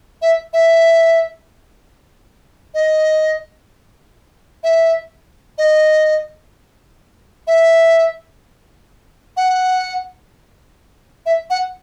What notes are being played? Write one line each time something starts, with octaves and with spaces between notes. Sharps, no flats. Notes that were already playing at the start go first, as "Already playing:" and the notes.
E5
E5
D#5
E5
D#5
E5
F#5
E5
F#5